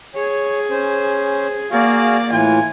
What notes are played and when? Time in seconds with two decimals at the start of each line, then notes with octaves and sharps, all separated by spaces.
0.15 G#4 C#5
0.71 C#4 C5
1.71 A#3 F#4 G#4 D5 F5
2.32 A2 E3 F4 G#5